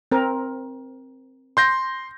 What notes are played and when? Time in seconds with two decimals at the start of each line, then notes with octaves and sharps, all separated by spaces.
0.12 C4 A#4
1.57 C6 G6 A#6